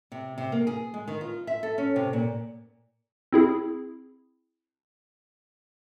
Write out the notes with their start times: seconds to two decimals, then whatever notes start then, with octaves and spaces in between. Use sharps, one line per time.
0.12 C3
0.38 C3
0.52 A#3
0.67 G#4
0.94 G#3
1.07 D#3
1.21 F4
1.47 E5
1.63 A4
1.78 C#4
1.96 C3
2.13 A#2
3.33 C4 E4 G#4